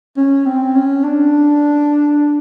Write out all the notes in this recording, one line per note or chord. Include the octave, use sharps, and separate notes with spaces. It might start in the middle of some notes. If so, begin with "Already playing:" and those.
C#4
C4
C#4
D4